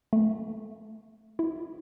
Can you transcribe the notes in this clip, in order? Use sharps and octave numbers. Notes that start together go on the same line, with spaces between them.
A3
E4